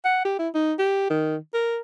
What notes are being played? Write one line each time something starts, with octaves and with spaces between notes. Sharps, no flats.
F#5
G4
E4
D#4
G4
D#3
A#4